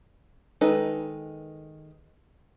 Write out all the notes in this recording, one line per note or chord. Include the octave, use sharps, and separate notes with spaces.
D#3 G#3 D#4 A4 B4